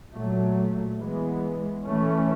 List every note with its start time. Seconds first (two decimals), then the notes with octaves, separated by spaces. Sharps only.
0.13 A#2 F#3 A3
0.99 E3 G#3 B3
1.84 E3 A3 C#4